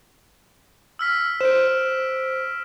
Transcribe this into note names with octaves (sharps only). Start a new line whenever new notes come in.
E6 F6 B6
C5 D7 E7